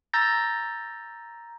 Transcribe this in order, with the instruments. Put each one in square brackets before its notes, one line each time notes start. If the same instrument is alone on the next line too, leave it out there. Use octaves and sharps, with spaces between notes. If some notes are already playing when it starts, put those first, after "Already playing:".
[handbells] A#5 E6 G6 A6 A#6